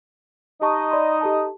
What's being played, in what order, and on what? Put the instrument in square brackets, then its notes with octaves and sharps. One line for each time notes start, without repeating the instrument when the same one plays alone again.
[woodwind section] D#4 D#5 [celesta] G4 A5 C#6
[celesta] D5 B5 C6
G4 A4 A5